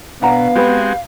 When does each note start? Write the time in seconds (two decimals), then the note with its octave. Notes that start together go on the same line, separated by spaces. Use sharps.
0.22 B2 B3 D4 F5 F#5 A#5
0.55 G#3 C4 F#4 G4 B4